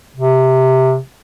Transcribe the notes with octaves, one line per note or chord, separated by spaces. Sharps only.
C3